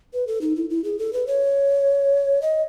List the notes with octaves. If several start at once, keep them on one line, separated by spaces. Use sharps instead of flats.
B4
A4
D#4
E4
E4
G#4
A4
B4
C#5
D#5